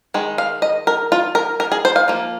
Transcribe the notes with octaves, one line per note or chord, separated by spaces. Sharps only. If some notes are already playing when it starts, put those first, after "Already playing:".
D#3 G#3
F5
D#5
A#4
F4
A#4
A#4
G#4
C5
F5
F3 A#3